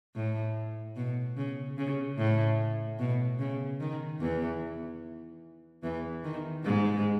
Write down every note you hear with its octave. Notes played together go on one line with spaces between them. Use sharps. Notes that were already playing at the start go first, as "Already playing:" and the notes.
A2
B2
C#3
C#3
A2
B2
C#3
D#3
E2 E3
E2 E3
D#3
G#2 G#3